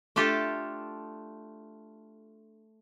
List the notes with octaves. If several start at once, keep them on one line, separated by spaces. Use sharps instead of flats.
A3 D4 F4 G4 A4